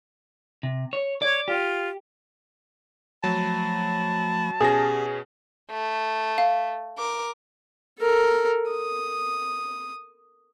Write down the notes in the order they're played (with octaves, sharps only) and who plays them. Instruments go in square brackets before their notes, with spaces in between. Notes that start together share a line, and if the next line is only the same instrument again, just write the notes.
[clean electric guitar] C3
C#5
[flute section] C#5 G#6 [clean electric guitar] D5
[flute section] F4 [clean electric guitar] G4
[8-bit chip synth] F3 A3 B5 [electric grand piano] F#3 [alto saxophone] A5
[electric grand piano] B2 C#4 A#6 [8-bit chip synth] G4 [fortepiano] G#4
[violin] A3
[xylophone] F5
[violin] A#4 D6
[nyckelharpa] A4 A#4
D#6